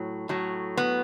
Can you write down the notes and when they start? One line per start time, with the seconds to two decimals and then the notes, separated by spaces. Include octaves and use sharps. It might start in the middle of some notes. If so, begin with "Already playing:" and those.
Already playing: A2 F#3
0.29 A2 F#3
0.77 B3